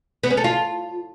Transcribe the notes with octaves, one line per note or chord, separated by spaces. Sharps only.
B3
C#4
A4
F4